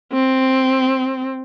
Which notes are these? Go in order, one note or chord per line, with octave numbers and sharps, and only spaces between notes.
C4